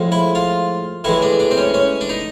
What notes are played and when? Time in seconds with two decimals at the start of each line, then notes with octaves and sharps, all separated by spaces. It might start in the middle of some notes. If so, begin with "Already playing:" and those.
Already playing: A2 F3 G#3
0.12 E4
0.35 F4
1.04 A2 E3 G#3 E4
1.22 D4
1.39 D4
1.51 C4
1.57 C#4
1.74 C#4
2.01 D4
2.09 D#4